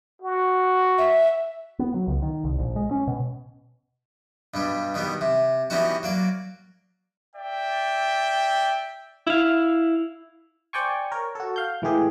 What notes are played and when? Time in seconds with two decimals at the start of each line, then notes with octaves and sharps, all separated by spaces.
0.22 F#4
0.98 E5
1.79 B3
1.94 F#3
2.07 C#2
2.22 D#3
2.44 C2
2.59 A#1
2.76 G#3
2.91 C#4
3.07 B2
4.54 G2 B2 G3
4.94 B2 D#3 G3 B3
5.21 C3
5.70 E3 G3 B3 C#4 D#4 F#4
6.03 F#3 A#3 D5
7.36 D5 E5 G5
9.27 E4 F5
10.73 C5 D5 G5 G#5 C#6
11.12 A#4 C#5
11.35 F#4 A4
11.56 F5 G6
11.82 A2 E3 G#3 G4 G#4